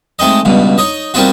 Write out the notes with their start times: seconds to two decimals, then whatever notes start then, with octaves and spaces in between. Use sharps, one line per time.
0.19 G#3 A3 C4 D#4 D#5
0.45 C#2 G2 B2
0.78 D#4 C#5 D#5
1.14 G3 A#3 C4 D#4 F4 F#4